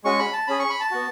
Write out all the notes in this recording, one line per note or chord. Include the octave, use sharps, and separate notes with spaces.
G#3 C#4 F#4 C#6
B5
A5
C#4 G#4 B5
C#6
B5
A5
B3 F#4